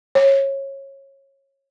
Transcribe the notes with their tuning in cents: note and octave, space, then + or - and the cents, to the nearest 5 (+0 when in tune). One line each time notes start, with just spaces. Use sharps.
C#5 -20